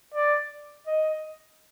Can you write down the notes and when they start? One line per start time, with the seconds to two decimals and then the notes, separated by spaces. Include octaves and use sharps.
0.14 D5
0.87 D#5